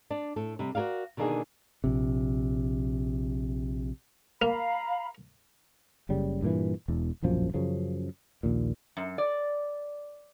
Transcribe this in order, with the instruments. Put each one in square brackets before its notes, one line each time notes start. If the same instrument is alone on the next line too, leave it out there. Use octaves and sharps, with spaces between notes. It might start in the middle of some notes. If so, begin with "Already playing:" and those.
[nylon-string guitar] D4 D5
A2 A4
C3 G3
F#4 G#4 A#4 D5 F5
B2 D3 D#3 A#3 D4 G#4
[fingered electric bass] A#1 C3
[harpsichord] A#3 [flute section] F5 A#5 B5
[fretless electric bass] F#1 C#3 G3
G2 A#2 D#3 E3
E1 E2
E1 A#1 F#2 F3
F#2 C#3 F3
A#1 D#2 A#2
[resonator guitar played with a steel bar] F#2
D5